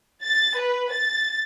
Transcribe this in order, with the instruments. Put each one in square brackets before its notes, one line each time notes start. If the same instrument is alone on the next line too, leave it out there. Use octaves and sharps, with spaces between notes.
[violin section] A6
B4
A6